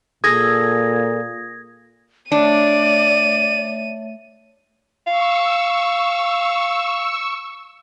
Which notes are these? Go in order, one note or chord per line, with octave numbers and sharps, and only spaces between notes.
A#2 G#4 A4 D#6 G#6 A#6
A3 D4 C#5 D5 E5 D#7
F5 C#6 E6